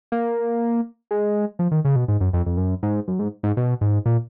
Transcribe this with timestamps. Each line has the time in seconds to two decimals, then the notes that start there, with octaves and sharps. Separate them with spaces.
0.12 A#3
1.11 G#3
1.59 F3
1.71 D#3
1.85 C#3
1.96 B2
2.08 G#2
2.21 F#2
2.33 F2
2.46 F2
2.57 F#2
2.83 G#2
3.08 F#2
3.19 G#2
3.43 G#2
3.57 B2
3.81 G#2
4.06 A#2